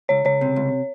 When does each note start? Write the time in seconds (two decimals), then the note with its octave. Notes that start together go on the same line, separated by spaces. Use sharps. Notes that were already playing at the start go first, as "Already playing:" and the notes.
0.09 C#2 C#5
0.25 C#2 C#5
0.41 C3
0.56 C#2